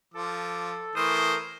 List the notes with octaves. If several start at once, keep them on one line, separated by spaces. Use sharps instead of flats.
F3 A4 D6
E3 A3 A#4 C5 D#6